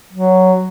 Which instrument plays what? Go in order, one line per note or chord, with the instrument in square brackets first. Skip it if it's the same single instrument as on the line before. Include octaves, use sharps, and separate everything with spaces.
[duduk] F#3